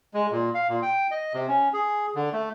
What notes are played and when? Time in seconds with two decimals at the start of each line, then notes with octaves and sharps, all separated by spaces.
0.14 G#3
0.31 A#2
0.54 F5
0.69 A#2
0.82 G5
1.11 D#5
1.34 C3
1.48 C#4
1.73 G#4
2.15 D3
2.33 A3